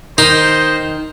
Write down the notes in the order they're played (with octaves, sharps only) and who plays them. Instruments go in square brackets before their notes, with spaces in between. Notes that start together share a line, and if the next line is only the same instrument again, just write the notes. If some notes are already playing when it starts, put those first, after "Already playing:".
[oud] D#3 [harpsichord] D#4 [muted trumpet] C5